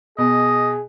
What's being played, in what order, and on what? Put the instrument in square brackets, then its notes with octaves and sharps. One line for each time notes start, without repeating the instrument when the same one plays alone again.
[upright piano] B2 [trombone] G#4 [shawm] D#5